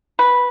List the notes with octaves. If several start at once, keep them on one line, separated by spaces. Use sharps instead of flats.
B4